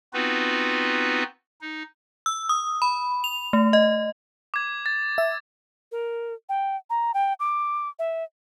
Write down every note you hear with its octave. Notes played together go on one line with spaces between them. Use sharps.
B3 C4 D#4 F4 F#4 B4
D#4
E6
D#6
B5
F7
A3
D#5
D6 G#6
A6
E5
A#4
G5
A#5
G5
D6
E5